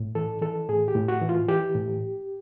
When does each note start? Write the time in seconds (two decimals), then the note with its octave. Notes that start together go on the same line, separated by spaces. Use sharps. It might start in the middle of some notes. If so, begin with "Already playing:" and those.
Already playing: A2
0.15 E3 A4
0.42 E3 A4
0.68 A2 G#4
0.88 G4
0.95 A2
1.08 F#4
1.22 E3
1.29 F4
1.48 E3 G4
1.75 A2